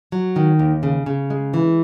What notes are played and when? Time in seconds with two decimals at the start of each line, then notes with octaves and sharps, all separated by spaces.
0.12 F#3
0.36 D#3
0.59 D#2
0.83 C#3
1.06 C#3
1.30 G#3
1.54 E3